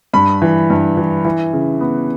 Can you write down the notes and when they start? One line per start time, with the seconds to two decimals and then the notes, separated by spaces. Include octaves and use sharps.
0.14 G2 B5
0.42 E3
0.70 G2
0.97 E3
1.25 E3
1.53 C#3
1.81 B3